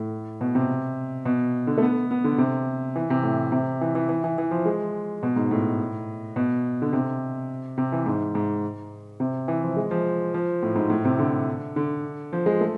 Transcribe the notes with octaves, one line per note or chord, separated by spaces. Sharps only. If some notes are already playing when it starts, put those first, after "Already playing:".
Already playing: A2
B2
C3
B2
D3
A3
B3
B3
D3
C3
E3
C3
A2
C3
E3
E3
E3
E3
E3
F3
G#3
B2
G#2
A2
B2
D3
C3
C3
E3
G#2
G#2
C3
E3
F3
G#3
F3
F3
A2
G#2
A2
C3
D3
D3
F3
G#3
A3